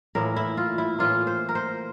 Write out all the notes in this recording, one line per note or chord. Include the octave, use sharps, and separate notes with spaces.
A2 E3 A#3 E4 A#4
E4
F4
E4
A2 E3 A#3 E4 F4
C5
A#4
C5